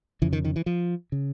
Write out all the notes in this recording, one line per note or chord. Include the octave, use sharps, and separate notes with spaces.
F2 C#3 E3
D#3
D#3
E3
F3
C#3